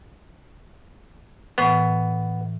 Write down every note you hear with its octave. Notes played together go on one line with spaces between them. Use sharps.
A2 E3 B3